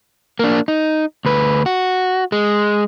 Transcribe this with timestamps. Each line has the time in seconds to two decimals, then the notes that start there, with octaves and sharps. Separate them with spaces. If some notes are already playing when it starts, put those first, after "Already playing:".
0.39 A#3 D4
0.68 D#4
1.25 D2 B4
1.66 F#4
2.32 G#3